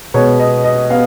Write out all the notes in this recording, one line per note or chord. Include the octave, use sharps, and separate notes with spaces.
B2 G#3 B3 C#5
D#5
D#5
B3 F5